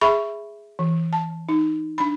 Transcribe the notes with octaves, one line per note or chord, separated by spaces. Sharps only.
G#4 E5 B5 C#6
E3
A5
D#4
D4 B5